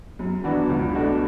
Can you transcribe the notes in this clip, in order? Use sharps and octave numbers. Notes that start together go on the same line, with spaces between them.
F#2
E3 B3 D4 F#4
C#2
B2 A3 D4 F#4